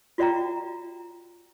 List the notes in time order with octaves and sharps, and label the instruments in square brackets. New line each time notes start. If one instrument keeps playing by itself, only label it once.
[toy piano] F4 F#4 D5 E5 G5 A#5